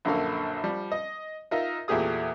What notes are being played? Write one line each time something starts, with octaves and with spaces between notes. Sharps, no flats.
A#1 F#2 D3 A#3 A4 F5
F3 G3
D#5
D#4 F4 A#4 D#5 E5
E2 A#2 A3 G4 G#4 D#6